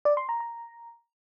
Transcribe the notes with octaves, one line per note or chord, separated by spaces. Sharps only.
D5
C6
A#5
A#5